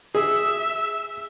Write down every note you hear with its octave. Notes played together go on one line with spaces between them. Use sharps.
G#4 E5